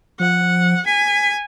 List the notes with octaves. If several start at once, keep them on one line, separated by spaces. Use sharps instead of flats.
F3 F#5
G#5 B6